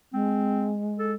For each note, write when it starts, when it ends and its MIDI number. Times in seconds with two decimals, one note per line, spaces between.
0.13 1.15 56
0.13 0.74 60
0.99 1.13 69